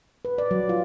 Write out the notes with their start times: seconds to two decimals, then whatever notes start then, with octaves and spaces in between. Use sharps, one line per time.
0.25 B4
0.38 D5
0.51 F#3
0.69 F4